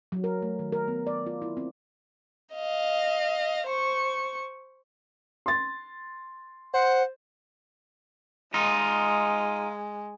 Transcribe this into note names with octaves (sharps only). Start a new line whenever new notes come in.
F#3
A#4
A3
D#3
A#4
B3
D5
F4
E4
C4
D#5 F5
C5 C#6
C6 A6
C5 F#5
G#3 D#4 F4